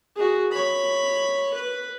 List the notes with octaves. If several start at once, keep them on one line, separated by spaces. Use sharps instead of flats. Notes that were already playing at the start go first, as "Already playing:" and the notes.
F#4 G#4
C#5 B5
B4